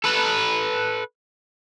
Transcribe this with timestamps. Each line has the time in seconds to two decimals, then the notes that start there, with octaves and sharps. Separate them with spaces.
0.04 A4 B4